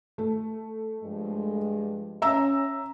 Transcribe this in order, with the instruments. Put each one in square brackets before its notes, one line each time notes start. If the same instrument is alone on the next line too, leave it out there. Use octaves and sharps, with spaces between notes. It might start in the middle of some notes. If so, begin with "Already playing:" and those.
[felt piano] A3
[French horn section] G2 F3 G#3
[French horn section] C#4 [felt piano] E5 A#5 E6